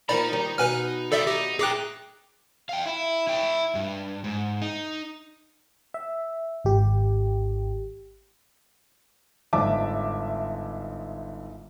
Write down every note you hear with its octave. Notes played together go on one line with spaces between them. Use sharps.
D#3 F3 A#3 D#4 D5 A#5 B5
D#3 G3
B2 B3 B4 F#5 G#5 F6
D#3 G3 A4 D5 E5
D#4 G4
A#2 D#4 E4 G#4 G5 D6 F#6
F5 G5
E4
E4 G5
G2
G#2
D#4
E5
G#1 G4
G1 G#2 D5 E5 A5 D6